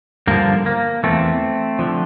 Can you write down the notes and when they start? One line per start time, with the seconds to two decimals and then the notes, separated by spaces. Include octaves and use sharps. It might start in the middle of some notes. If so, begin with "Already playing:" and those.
0.27 G2 D3 F3 A#3
0.66 A#3
1.03 E2 E3 A3 C4
1.79 D3 F3